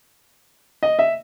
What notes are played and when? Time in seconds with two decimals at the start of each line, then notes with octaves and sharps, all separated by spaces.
0.83 D#5
0.99 E5